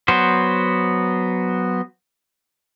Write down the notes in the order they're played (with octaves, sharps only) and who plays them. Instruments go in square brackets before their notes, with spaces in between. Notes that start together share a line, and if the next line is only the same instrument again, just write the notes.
[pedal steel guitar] F#3 B3 C5